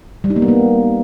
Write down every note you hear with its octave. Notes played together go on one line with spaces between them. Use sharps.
G3
D#4
A#3
B3
A#3